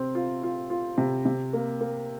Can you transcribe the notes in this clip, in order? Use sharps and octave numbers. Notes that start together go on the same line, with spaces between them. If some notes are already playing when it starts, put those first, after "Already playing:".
Already playing: C3 C4
F4
F4
F4
C3
C3
A#3
A#3